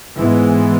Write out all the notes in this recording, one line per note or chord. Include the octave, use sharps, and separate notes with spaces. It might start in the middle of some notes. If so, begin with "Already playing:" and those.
G#2 E3 G#3 B3